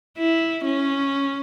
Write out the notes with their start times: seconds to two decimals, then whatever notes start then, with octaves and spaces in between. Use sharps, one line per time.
0.18 E4
0.65 C#4